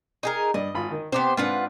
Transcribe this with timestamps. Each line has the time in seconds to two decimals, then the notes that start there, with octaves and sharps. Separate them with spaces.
0.23 D#4 G#4 A#4
0.54 G2 D5 D#5
0.74 G#1 F4 B5
0.91 D#3
1.12 C3 B3 G4 C5
1.37 G#2 C4 D4 F4 B4 F#5